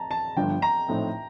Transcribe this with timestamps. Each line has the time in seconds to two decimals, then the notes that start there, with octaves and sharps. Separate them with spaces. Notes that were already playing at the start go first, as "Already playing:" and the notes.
Already playing: A5 A#5
0.11 A5
0.36 G1 G2 D3 F3 G5
0.62 A#5
0.88 A#1 A2 A3 C4 D#4